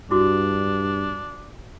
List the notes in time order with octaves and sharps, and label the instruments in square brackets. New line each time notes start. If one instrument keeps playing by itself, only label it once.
[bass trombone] G2 [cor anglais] D4 [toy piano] E4 F#4 D6